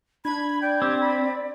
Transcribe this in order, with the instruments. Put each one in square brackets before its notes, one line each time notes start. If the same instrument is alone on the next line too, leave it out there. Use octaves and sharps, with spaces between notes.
[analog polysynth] D4 G#6 [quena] B5
[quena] D5 [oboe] G5
[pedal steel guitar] C4 [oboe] G4
[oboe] B5